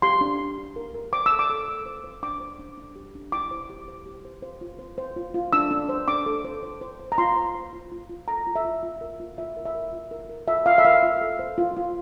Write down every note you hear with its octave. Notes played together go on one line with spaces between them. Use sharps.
G4 C6
D4
D4
G4
A#4
A#4
C5 D6
E6
A4
D6
A4
A4
C5
C5
D4 D6
C5
D4
D4
G4
D4
E4 D6
C5
G4
C5
G4
C5
C5
F4
C5
C5
F4
F4
D4 E6
D4
C5
D4 D6
A4
C5
C5
C5
C5
A#5
F4 C6
C5
C5
F4
F4
F4
A4 A#5
F4
E5
F4
F4
A#4
F4
F4 E5
A#4
E5
A#4
F4
A#4
A#4
F4 E5
F4 F5
E5
A#4 F5
F4
A4
C5
F4
F4